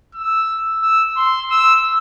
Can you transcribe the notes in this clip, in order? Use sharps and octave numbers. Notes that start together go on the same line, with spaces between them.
E6
E6
C6
E6